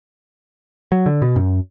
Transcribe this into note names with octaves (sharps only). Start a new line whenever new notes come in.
F#3
D3
B2
F#2